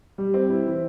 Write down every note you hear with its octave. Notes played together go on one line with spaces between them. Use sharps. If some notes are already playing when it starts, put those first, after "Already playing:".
G3
C4
E4
E3